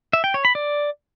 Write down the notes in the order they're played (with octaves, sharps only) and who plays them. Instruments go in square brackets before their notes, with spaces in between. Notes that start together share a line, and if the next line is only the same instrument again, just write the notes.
[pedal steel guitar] E5
G5
C#5
B5
D5